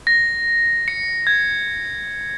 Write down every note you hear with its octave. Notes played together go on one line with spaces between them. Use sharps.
A#6
C#7
G#6